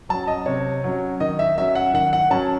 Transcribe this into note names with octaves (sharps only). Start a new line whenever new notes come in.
F#3 C#4 A5
D#5
C3 C#5
F#3 C#4
D#3 D#5
E5
F#3 C#4 E5
F#5
D#3 F#5
F#5
F#3 C#4 A5